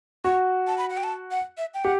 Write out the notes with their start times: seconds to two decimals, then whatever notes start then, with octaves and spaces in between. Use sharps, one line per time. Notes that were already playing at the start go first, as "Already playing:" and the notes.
0.24 F#4 C#6
0.67 A5
0.78 B5
0.90 F#5
0.97 G5
1.04 A5
1.31 F#5
1.58 E5
1.74 G5
1.84 G4 F#5